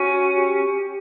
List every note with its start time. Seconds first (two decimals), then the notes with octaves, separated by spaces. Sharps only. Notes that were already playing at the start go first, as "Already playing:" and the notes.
Already playing: C#4 F#4
0.35 G4